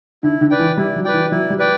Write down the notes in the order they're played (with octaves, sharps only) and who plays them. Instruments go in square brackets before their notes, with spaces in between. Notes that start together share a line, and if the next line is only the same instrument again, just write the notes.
[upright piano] D3 [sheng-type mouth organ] E4
[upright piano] D3
[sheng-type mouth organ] B4 D5 G5
[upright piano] E3
[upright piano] G3 [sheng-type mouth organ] E4
[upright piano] F#3
[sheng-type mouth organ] B4 D5 G5
[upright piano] E3
[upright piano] F#3 [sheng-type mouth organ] E4
[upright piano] G3
[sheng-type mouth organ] B4 D5 G5